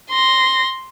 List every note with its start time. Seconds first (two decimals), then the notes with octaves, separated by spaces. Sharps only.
0.10 C6 A#6